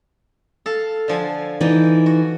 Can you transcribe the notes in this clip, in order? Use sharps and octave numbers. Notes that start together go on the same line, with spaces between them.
A4 F5
D3 F3 G#5
E3 D#4 D5
F#4